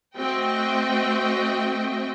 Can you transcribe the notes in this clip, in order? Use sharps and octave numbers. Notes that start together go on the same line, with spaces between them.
A3 C4 F#4 D#5 G5